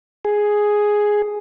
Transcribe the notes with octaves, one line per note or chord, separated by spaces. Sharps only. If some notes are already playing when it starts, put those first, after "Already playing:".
G#4